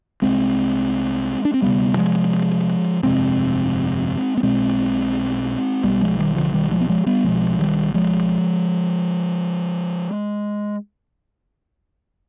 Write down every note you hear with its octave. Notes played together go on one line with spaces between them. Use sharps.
C2 C3 G#3 C4
D4
C4
D2 C3 G3 B3
F3 G#3
G1 F2 C3 G#3 C4
B3
B1 B2 G#3 C4
B1 B2 G3 B3
F3 G#3
D#3 G3
D3 F3
D#3 G3
F3 G#3
B3
F3 G#3
G3 B3
B1 B2 F3 G#3
D#3 G3
F3 G#3